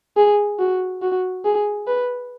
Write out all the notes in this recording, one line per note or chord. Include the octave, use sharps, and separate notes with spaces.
G#4
F#4
F#4
G#4
B4